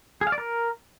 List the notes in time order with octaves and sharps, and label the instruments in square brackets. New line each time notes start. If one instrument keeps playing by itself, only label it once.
[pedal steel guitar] G#4
F5
D5
A#4